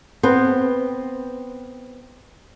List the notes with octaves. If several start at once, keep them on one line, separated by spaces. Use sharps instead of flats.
B3 C4